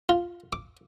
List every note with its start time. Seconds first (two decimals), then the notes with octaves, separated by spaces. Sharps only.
0.09 F4
0.53 D6